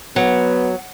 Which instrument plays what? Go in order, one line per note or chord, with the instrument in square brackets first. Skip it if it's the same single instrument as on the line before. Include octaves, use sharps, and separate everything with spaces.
[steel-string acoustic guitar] F#3 [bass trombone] B3